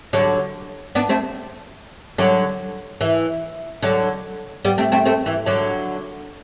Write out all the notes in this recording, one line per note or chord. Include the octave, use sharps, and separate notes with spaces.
D3 F#3
B3 D4
A3 C4
D3 F#3
E3
D3 F#3
G3 B3
A3 C4
A3 C4
A3 C4
E3
D3 F#3